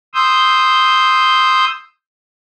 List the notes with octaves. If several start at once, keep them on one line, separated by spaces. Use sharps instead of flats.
C6 D#6 E6 G6